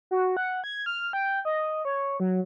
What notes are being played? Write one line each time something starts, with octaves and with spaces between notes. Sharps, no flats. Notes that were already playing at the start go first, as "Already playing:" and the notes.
F#4
F#5
G#6
F6
G5
D#5
C#5
F#3